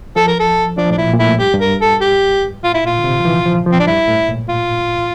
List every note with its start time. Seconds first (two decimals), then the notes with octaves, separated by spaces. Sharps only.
0.16 F3 A4
0.28 A#4
0.40 A4
0.77 F3 D4
0.90 A2 D4
0.98 A#2 E4
1.13 A#2
1.19 A2 E4
1.39 G2 G4
1.54 G2
1.61 A#4
1.81 A4
2.01 G4
2.63 A2 F4
2.74 E4
2.84 A#2 F4
2.99 D3
3.04 C3
3.19 F3
3.25 E3
3.46 F3
3.66 F3
3.72 C4
3.80 D4
3.87 G2 E4
4.08 A2
4.28 A#2
4.49 F4